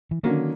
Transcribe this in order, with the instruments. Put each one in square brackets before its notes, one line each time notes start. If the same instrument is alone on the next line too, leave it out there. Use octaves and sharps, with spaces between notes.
[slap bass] E3
[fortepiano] D3 F#3 A#3 C#4 [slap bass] D#3